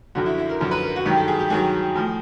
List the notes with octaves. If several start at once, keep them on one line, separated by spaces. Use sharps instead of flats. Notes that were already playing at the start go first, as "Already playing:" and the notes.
F#2 D3 F3 F#4
E4
E4
A#4
F#2 D3 F3
B4
A#4
F#4
G2 D#3 F#3 G4
A4
G#4
G4
G2 D#3 F#3 G#4
A2 F3